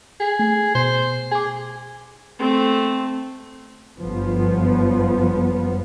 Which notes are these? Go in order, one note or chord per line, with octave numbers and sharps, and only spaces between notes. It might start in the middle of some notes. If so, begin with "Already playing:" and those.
G#4
A3
B2 C5
G#4 G#5 D6
A3 C4
G1 F#2 F3 B3